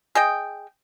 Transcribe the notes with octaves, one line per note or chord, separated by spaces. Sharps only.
G#4 D#5 G5